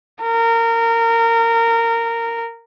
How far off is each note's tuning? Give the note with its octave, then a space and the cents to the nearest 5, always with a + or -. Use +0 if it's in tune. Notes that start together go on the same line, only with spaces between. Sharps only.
A#4 -20